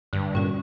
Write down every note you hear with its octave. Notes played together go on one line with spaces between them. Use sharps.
G2 D3
A#2 G3 C#4 F#4